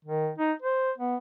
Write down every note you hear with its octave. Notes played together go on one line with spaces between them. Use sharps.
D#3
D#4
C5
B3